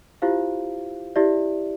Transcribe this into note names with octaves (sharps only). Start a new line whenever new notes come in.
E4 F4 G4 C5 F5
E4 G4 D5 E5